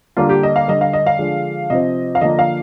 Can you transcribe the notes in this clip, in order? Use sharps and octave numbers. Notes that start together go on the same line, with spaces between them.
D3 G3 A#3 D4 F4
G4
D#5
F5
D3 G3 D4 D#5
F5
D#5
F5
D3 F3 G#3 D4
C3 F3 C4 D#5
F5
D3 F3 A#3 D4 D#5
F5